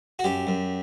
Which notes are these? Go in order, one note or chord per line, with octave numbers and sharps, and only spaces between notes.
F#4
F#2 G4
F#2